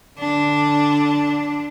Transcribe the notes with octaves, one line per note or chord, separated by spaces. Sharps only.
D3 D4